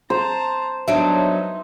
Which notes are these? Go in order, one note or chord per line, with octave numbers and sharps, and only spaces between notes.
C5 A5 A#5
F#3 B3 D4 D#4 E5